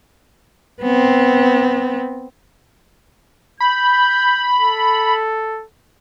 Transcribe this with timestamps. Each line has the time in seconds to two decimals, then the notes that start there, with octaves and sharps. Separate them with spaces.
0.82 B3 C4
3.60 B5 G6
4.59 A4